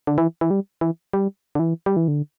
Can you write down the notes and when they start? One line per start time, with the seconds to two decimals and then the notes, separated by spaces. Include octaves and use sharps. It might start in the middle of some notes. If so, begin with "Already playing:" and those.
0.07 D3
0.18 E3
0.41 E3
0.51 G3
0.81 E3
1.13 G3
1.55 D3
1.59 E3
1.86 G3
1.97 E3
2.08 D3